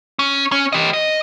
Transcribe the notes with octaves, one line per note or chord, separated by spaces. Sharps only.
C#4
C#4
G4 D#5
D#5